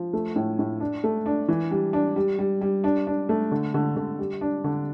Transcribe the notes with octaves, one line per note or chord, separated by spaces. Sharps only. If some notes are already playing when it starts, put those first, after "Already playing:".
Already playing: F3
A3
A2
A2
D4
A3
D4
E3
G3
D4
G3
G3
G3
D4
D4
A3
D3
D3
D3
G3
D4
D3